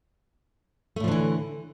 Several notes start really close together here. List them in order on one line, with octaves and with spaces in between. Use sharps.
A3 A2 F3 D3 E3